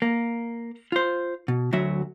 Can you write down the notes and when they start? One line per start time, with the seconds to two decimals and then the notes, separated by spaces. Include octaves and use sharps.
0.02 A#3
0.92 F4 C5
1.48 B2
1.73 D2 F#3 F#4 E5